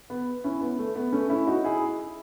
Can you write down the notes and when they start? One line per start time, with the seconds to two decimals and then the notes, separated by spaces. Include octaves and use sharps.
0.10 B3
0.44 C#4 E4
0.61 B3
0.79 A3
0.96 B3
1.12 A3 C#4
1.30 C#4 E4
1.47 D#4 F#4
1.64 E4 G#4